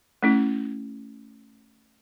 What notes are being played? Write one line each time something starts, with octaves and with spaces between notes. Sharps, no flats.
A3 C#4 E4